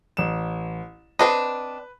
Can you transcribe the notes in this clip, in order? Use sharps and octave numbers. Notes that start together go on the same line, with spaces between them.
A1 E7
C4 D4 B4 D#5